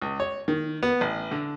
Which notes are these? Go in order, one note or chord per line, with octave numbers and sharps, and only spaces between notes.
C#2
C#5
D#3
B3
A1
D3